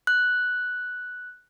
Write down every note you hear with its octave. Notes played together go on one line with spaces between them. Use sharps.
F#6